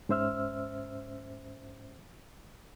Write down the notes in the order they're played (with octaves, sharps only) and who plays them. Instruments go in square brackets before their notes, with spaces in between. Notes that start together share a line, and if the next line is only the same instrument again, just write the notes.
[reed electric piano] G#2 C#4 C5 E5 E6 F6